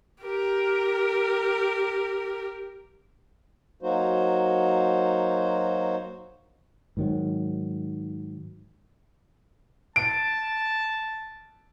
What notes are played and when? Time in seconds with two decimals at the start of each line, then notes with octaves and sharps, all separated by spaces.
0.23 G4 A#4
3.82 F#3 A#3 D#4 F#4 C5
6.97 G#2 D#3 F#3
9.96 A5 D7